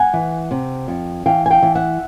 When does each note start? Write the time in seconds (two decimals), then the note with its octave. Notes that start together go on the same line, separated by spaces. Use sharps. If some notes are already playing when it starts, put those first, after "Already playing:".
Already playing: F#5 G#5
0.14 E3
0.51 C3
0.88 F2
1.26 E3 F5 G5
1.46 G#5
1.50 F5 G5
1.62 E3
1.75 E5 F#5